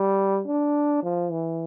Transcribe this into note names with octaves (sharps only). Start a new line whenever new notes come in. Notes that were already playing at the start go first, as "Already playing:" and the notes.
Already playing: G3
D4
F3
E3